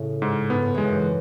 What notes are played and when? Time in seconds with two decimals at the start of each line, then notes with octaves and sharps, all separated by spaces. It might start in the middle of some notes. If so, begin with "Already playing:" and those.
Already playing: A2 C#3
0.22 G#2
0.50 G#2 B3
0.62 F#2
0.74 E2 G#3
0.87 F#2